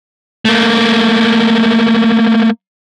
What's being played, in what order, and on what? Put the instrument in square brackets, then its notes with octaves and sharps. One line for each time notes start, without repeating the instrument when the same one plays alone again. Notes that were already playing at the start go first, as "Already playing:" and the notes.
[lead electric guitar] A3 A#3